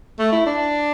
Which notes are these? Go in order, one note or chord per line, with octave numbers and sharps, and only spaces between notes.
A3
E4
D4